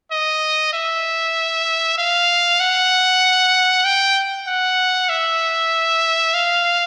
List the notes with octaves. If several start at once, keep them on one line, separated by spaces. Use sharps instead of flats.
D#5
E5
F5
F#5
G5
F#5
E5
F5